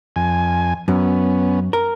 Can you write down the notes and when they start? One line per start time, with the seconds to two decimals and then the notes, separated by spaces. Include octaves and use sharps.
0.16 F2 G#5
0.88 F#2 B3 C#4
1.73 A#4